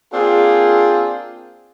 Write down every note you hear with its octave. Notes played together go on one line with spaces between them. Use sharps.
A#3 C4 D4 F4 G#4